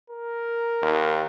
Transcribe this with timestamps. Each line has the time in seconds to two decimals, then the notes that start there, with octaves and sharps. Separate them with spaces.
0.10 A#4
0.82 D#2